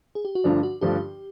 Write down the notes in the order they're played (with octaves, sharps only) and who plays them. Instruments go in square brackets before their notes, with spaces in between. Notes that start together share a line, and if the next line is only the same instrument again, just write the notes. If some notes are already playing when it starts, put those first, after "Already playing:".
[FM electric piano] G#4
G4
F#4
[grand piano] G2 D3 F3 A3 D4 [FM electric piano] F4
[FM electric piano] F#4
[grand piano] G2 D3 F3 A3 D4 [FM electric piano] G4